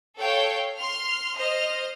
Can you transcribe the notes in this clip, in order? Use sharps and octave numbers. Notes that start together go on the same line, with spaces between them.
A4 C#5 F5 G5
C6 F6
C5 D#5 F6